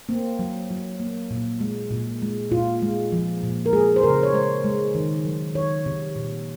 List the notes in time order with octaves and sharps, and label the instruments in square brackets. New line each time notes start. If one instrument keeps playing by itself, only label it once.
[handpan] A#3 C4
F#3
F#3
A#3
A#2
G#3
A#2
G#3
A#2 F4
G#3
F3
A#2
A#4
G#3 G#4
C5
C#3 A#4
C#5
G#3 C5
G#3
D#3
F#3
D#3 C#5
C3
A#2